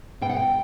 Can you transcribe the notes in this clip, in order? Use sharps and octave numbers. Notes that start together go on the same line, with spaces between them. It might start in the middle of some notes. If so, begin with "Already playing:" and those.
B2 G5
F#5
G5